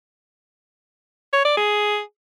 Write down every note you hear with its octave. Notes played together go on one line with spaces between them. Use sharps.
C#5
D5
G#4